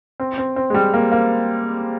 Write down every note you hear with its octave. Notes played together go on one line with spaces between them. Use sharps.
C4
C4
C4
G#3
G3
A#3
A#3